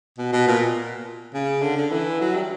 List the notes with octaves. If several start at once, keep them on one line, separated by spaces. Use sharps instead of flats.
B2
B2
A#2
C#3
D3
D3
E3
F#3
G3